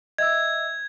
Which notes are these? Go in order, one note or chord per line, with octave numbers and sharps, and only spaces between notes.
D#5 E5 E6 G#6